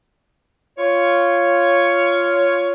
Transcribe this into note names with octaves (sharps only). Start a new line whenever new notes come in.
F4 C#5